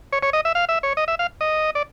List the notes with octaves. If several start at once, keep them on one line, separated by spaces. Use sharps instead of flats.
C#5
C#5
D#5
E5
F5
E5
C#5
D#5
E5
F5
D#5
D5